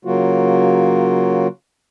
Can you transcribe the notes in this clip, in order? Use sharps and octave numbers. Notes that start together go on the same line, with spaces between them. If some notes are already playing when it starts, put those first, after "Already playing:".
C#3 F#3 A#3 F4 F#4